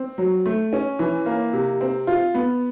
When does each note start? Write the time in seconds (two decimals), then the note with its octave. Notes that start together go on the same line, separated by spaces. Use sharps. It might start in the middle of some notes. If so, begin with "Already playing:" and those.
Already playing: C4
0.18 F#3
0.46 A3
0.73 C#4
0.99 E3
1.26 A#3
1.53 C3
1.81 C4
2.07 F4
2.34 B3